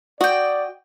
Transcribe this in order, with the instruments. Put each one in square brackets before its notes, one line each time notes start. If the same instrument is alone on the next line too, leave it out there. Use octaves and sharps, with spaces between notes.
[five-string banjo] F#4 [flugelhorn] D5 [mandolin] D#5 G5